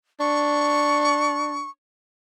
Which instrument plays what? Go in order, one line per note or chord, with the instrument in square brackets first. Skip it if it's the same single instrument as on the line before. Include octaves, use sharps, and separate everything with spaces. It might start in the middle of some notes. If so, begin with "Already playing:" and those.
[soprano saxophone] D4 [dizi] C#6